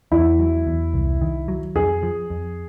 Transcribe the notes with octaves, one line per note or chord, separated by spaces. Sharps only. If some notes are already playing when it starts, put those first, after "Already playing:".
E2 E4
F#3
E2
C2
D#3
F#3
F2 G#4
F3
F2